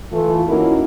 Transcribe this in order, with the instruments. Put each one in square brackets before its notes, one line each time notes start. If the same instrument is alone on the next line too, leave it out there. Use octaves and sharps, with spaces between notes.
[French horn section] E3 A3 F4
A#3 C#4 D#4 E4 F#4 A#4